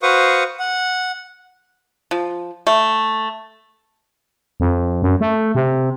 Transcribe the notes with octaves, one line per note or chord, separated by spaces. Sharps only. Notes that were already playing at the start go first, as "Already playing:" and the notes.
F#4 B4 C5 F5 C#6 D#6
F#5
F3
A3
F2
F#2
A3
C3